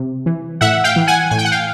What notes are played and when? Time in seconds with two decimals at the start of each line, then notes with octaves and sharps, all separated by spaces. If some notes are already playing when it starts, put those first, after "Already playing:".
Already playing: C3
0.26 E3
0.61 A2 E5 F#5
0.84 F5 G5
0.96 E3
1.07 F#5 G#5
1.31 A2 G#5
1.38 G5
1.45 F#5
1.52 F5 G5